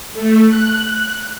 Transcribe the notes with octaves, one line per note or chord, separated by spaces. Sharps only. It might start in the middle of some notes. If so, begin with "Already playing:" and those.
A3
F#6